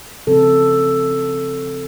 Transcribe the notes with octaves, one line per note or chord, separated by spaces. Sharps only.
C#3 F3 C4 A4